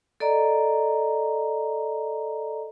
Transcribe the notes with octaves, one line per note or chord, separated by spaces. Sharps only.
A4 D5 D#5 A#5